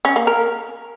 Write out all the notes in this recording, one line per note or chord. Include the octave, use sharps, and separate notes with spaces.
C#4
A#3
A#4